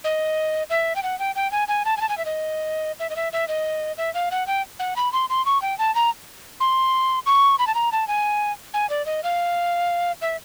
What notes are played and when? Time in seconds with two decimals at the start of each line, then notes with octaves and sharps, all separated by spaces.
0.04 D#5
0.70 E5
0.96 G5
1.03 F#5
1.19 G5
1.35 G5
1.52 G#5
1.68 G#5
1.85 A5
1.97 G#5
2.01 A5
2.09 G#5
2.18 E5
2.26 D#5
3.00 E5
3.10 D#5
3.16 E5
3.33 E5
3.48 D#5
3.98 E5
4.14 F5
4.31 F#5
4.47 G5
4.79 F#5
4.96 B5
5.13 C6
5.30 C6
5.46 C#6
5.62 G5
5.79 A5
5.95 A#5
6.60 C6
7.26 C#6
7.59 B5
7.67 A5
7.75 A#5
7.92 A5
8.08 G#5
8.74 G#5
8.90 D5
9.06 D#5
9.24 F5
10.22 E5